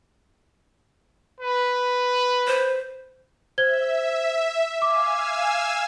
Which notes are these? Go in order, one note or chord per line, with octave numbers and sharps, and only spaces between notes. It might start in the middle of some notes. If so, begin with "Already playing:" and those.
B4
C5
C5 E5 G#6 G7
F5 G#5 D6 E6